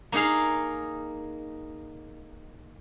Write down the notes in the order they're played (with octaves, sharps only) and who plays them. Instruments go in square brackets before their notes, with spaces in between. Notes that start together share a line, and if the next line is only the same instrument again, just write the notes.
[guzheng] A#3 D#4 G#4 F5